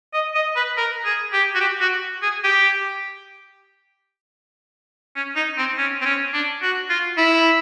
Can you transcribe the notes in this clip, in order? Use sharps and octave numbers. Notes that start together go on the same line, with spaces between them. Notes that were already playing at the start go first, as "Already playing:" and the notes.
D#5
D#5
B4
A#4
G#4
G4
F#4
G4
F#4
G#4
G4
C#4
D#4
C4
C#4
C4
C#4
D4
F#4
F4
E4